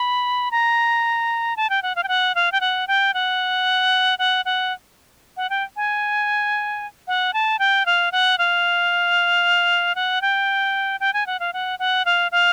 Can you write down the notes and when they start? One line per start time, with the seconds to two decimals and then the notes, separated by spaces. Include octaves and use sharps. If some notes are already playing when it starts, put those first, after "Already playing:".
Already playing: B5
0.51 A#5
1.57 A5
1.70 G5
1.82 F#5
1.96 F5
2.03 G5
2.08 F#5
2.35 F5
2.52 G5
2.61 F#5
2.88 G5
3.14 F#5
4.19 F#5
4.45 F#5
5.37 F#5
5.50 G5
5.76 G#5
7.08 F#5
7.34 A5
7.59 G5
7.86 F5
8.12 F#5
8.38 F5
9.95 F#5
10.22 G5
11.00 G5
11.13 G#5
11.27 F#5
11.40 F5
11.53 F#5
11.79 F#5
12.05 F5
12.32 F5